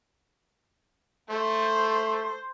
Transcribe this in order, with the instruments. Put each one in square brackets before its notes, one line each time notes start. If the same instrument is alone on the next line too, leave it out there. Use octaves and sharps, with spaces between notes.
[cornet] A3 [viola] C5